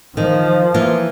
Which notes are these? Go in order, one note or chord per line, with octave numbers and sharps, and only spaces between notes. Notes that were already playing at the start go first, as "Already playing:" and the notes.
D#3 F3
E3 A#3 F4